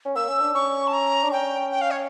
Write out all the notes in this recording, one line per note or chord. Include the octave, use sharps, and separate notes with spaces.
C#4
A#3 E6
C#4
D4
C#4 C#6
A5
A#5
D4
C#4 G5
G5
F5
C#5